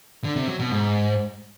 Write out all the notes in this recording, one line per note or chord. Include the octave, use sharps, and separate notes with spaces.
D3
C3
F#3
B2
G#2